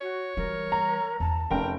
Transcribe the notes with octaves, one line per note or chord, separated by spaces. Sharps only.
F#4 C#5
E3 G3 A#4
A#5
E2 A5
F1 C#4 F4 A#4 G5